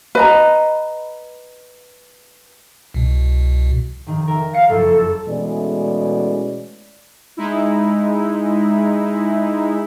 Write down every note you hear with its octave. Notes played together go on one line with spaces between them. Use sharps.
B4 D#5 A#5
C2 B2
F1 D#3
A#4 E5 G5
F5 A#6 C7 C#7
F#1 F2 A4
B2 E3 G#3 A3 C#4 D5
G#3 D#4 E4